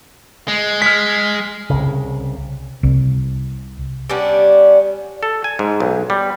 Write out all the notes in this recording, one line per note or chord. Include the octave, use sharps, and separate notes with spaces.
G#3
G#3 F6 B6
C2 C#3
C2
G3 B3 C#4 D4
A4
G#5
G#2
B1
G3